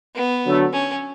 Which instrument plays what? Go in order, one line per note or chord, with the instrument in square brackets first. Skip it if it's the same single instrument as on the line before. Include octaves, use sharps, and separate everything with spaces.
[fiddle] B3
[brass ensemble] D3 F#3 A3
[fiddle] C#4